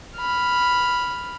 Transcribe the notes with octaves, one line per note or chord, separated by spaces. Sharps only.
B5 F6